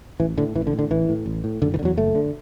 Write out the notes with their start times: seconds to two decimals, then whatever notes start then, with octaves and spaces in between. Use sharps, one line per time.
0.20 A1 E3
0.38 A2 D3
0.55 A1 E3
0.67 D3
0.73 A2
0.79 D3
0.90 A1 E3
1.09 A2
1.26 A1
1.44 A2
1.62 F#1 D3
1.74 E3
1.79 D3
1.83 E2 F#3
1.97 F#1 A3
2.15 D3